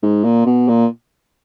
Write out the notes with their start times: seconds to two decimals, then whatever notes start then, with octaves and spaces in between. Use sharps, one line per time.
0.03 G#2
0.24 A#2
0.46 B2
0.68 A#2